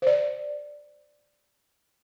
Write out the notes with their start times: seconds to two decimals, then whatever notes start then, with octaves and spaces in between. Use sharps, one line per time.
0.02 C5 D5